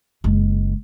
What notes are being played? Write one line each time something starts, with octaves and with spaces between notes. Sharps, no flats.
F#1 G#3